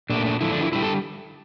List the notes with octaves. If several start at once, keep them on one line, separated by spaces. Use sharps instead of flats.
A#2 A3 D4
D4
D3 F3 A3 E4
D4
E4
D3 G3 E4
A4